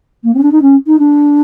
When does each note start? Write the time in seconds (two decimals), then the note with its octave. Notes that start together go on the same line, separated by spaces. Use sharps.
0.24 A#3
0.35 C4
0.38 C#4
0.43 D4
0.52 D#4
0.62 C#4
0.87 D#4
0.99 D4